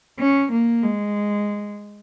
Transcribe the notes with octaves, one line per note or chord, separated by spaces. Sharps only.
C#4
A#3
G#3